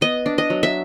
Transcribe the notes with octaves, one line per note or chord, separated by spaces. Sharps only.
B3 D#5
D4
D#5
F#3
E5